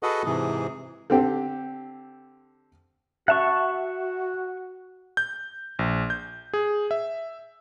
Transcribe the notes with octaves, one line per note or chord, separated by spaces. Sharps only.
F#4 G#4 A4 B4 D#5 F#5
G#2 C3 E3 G#4
D3 C4 G4
F#4 E5 F#5 A5 C#6 E7
G6
A#1
G6
G#4
E5